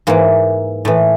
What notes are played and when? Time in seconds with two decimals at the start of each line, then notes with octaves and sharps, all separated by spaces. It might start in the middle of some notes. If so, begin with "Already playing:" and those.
0.07 G#2 E3 A#3
0.85 A2 E3